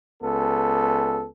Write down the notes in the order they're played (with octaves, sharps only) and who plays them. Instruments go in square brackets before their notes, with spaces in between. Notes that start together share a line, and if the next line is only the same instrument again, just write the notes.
[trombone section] C#2 B3 A4